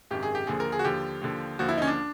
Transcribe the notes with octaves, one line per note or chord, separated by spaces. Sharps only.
G#1 F#2 D#3 G4
G#4
G4
D#2 D3 F3 G#4
A#4
G#4
F#4
D#2 D3 F3 G4
D#2 D3 F3
D#2 D3 F3 F#4
E4
C#4 D#4
D4